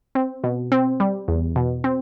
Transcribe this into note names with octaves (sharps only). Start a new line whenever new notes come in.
C4
B2
C4
G3
E2
B2
C4